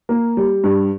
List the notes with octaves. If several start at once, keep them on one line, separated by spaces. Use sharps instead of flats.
A#3
G3
G2